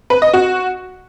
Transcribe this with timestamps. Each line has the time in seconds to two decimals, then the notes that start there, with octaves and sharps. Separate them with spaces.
0.10 B4
0.22 D#5
0.34 F#4